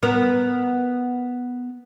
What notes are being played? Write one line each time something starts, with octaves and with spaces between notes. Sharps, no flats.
B3 A#4